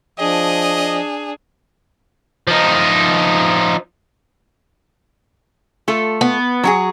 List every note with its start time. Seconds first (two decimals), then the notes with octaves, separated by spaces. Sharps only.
0.19 F3 D4 G#4 D#5
2.47 F3 D#4
5.88 A3 F4 A4
6.21 B3
6.63 F#3 F#4 G#4